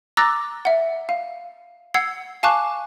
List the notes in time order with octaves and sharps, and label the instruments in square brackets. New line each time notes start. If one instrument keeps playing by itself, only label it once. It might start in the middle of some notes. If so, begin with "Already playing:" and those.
[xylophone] A#5 D6 E6 F#6 A6 A#6
E5 F#5
F5
F#5 E6 G#6 C7
F5 G#5 A5 C#6 D6 F#6